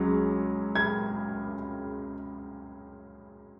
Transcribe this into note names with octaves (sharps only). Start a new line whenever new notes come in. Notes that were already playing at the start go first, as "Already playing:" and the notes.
Already playing: C#2 F#3 C#4
G#6